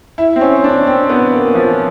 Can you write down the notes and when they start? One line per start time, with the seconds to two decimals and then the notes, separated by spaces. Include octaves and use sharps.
0.18 E4
0.36 C4
0.41 C#4
0.64 D4
0.87 C4
1.09 B3
1.32 A#3
1.55 F3